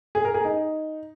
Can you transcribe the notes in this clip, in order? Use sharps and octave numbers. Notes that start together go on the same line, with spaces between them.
G#4
A#4
G#4
D#4